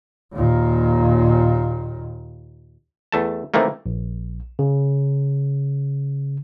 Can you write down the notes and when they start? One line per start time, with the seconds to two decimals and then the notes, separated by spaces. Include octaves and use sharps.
0.34 D#2 A#2
3.12 E2 A3 A5
3.54 C3 D#3 E3 A3 A#3
3.86 A#1
4.59 C#3